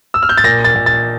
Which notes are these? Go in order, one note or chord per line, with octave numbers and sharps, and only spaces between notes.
E6
F6
G6
A6
A#2 A#6
A6
A#2
A6